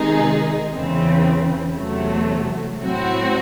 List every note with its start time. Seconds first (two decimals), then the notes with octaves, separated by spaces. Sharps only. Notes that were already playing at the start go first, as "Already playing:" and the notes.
Already playing: C3 D#3 G#3 D#4 G#4
0.71 E2 C#3 E3 C4
1.75 E2 C3 F#3 A3
2.79 A2 F#3 C4 F#4